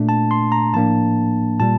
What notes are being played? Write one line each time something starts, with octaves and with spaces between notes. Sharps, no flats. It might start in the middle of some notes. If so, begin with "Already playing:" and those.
Already playing: A#2 A3 D4
A5
C6
A#5
A2 F3 A#3 D4 A5
A#2 G3 A5